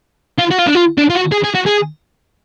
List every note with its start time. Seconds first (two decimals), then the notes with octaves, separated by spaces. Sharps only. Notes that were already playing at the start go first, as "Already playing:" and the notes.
0.39 F4
0.51 F#4
0.59 F4
0.67 D4
0.75 F4
0.98 D4
1.10 F4
1.15 F#4
1.32 G#4
1.44 G#4
1.55 F#4
1.66 G#4